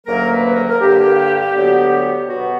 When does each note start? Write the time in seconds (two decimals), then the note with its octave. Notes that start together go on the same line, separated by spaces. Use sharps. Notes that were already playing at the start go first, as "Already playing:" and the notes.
0.06 D2 C#3 F#3 A#3 A#4
0.32 B4
0.56 A#4
0.69 A#4
0.80 G2 D3 A#3 G4
1.54 D2 D3 F#3 B3
2.27 B2 F#3 B3 F#4